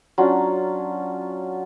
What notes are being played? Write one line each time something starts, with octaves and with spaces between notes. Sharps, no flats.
F#3 C#4 D4 F4